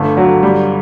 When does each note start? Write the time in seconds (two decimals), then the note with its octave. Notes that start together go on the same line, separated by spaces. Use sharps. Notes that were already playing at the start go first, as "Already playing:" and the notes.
Already playing: G1 A3
0.17 F#3
0.43 G3